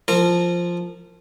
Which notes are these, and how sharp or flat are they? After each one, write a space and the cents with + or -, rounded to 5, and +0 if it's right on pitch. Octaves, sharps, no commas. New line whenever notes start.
F3 +0 A#4 -30